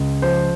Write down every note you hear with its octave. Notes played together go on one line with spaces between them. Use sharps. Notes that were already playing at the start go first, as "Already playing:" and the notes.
Already playing: C#2
F3 C5